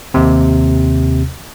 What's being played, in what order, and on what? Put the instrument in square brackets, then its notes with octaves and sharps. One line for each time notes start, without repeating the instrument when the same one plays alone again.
[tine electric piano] D#2 C3